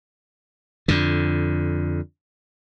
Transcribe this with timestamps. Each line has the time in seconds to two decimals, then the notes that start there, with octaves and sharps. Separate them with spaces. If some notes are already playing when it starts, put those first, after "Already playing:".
0.88 F2 D3